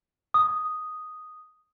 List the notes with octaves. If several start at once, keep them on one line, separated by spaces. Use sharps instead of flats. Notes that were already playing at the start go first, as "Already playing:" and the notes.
D#6